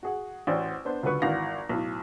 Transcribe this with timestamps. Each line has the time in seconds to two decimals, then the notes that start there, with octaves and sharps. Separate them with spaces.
0.03 F#4 G#4 F#5
0.47 A1 F#4 C5 D5
0.85 B3 D4 C5
1.03 C#2 D3 F#3 B4 C#6
1.22 G#1 E3 F#4 F5 A#6
1.69 B1 A2